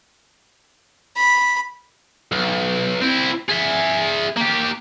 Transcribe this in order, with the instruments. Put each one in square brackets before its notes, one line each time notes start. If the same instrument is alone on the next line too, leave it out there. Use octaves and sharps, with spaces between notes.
[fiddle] B5
[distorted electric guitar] B1
C4 E4
G#4 E5
A#3 G4